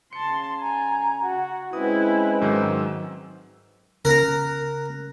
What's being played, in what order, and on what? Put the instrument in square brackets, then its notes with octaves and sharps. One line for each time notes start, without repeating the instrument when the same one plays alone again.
[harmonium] C#3 [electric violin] A5 C6 [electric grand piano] C#7
[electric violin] G#5 [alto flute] A#5
[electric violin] F#4 [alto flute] F#5
[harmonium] G#3 C4 C#4 [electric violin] E4 [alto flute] B4 [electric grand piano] D#6
[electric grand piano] G#2 D#3 F#3 [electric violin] E6
[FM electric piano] C#3 F#6 [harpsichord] A#4 A#5